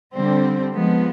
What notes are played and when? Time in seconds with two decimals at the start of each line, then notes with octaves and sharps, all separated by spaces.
0.13 D3 G3 C4
0.73 F3 G#3 B3